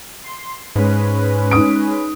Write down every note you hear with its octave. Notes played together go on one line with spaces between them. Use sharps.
C6
G#2 G#3 C#4 B4
D#4 D#6 D7